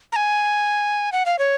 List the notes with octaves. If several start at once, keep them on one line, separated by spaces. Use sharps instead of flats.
A#5
G#5
F#5
F5
C#5